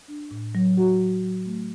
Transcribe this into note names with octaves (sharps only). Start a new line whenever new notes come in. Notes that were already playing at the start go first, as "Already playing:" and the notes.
D4
A2
F#3
F#4
F#3
F#3
A3